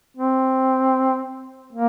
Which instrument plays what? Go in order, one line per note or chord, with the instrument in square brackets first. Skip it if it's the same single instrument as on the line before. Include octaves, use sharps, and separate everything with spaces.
[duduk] C4
A#3